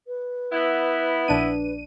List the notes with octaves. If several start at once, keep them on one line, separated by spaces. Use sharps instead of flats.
B4
B3 E4
A#1 D4 D#7